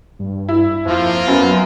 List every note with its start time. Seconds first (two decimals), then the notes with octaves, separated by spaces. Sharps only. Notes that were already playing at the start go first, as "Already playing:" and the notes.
0.19 G2
0.49 E4
0.86 F2 F3 A#3 F4
1.27 F#2 F#3 B3